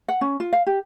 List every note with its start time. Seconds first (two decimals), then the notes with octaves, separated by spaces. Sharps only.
0.08 F#5
0.21 C#4
0.40 F4
0.53 F5
0.67 G4